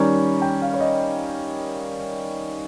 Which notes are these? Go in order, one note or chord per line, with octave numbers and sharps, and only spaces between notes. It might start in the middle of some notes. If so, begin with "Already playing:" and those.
Already playing: D#3 G3 C#4 A#5
G5
F5
C#5
D#5